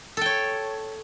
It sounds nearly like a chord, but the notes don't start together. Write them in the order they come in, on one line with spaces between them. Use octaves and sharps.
A4 G5 C#5